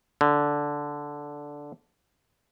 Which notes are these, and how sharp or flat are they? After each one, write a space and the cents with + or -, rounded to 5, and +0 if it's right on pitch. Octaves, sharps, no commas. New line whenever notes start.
D3 -5